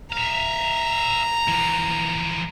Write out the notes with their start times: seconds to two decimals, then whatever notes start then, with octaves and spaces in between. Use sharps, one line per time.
0.12 E5 F5 A#5
1.48 E3 F3